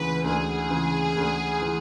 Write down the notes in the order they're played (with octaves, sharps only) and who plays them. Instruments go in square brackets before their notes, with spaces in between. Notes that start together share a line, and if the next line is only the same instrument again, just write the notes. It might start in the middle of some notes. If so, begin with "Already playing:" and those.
Already playing: [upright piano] D2 C#3 E3 [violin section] B4
[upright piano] D2 [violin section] G#4
[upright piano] C#3 E3
D2
E3